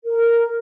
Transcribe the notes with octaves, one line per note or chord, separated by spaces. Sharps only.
A#4